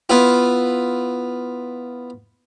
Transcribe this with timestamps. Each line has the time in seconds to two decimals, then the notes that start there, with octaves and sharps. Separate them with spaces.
0.09 B3 E4 F4